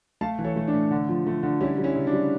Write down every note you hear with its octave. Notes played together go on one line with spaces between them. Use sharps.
A3 F5 A5
E3
A4 C#5
A3
D4
A2
D3
F3
A3
D3
G3 C#4 E4
G3
C#4 E4
C#3
D4
G3